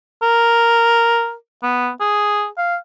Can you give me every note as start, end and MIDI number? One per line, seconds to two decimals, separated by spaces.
0.22 1.34 70
1.63 1.90 59
2.01 2.47 68
2.58 2.76 77